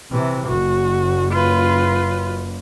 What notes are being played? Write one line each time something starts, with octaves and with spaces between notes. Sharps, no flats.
C3 E3
F#1 F#4
F4 B4